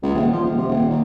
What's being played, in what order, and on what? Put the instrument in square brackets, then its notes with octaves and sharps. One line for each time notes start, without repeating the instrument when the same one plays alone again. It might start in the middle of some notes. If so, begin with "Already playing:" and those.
[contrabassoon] C#2
D#1
F3
D#1
C3
D#1
D#2